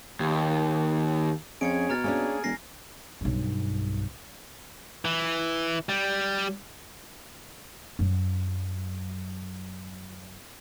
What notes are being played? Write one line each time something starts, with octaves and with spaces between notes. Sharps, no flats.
D#2
F2 C#4 G#4 G#6 C#7 D7
B2 A#5 F6 A6
A#3 C#4 D4 G#4
E1 G#5 A#6 C7
B1 G2
E3
G3
F#2 F#3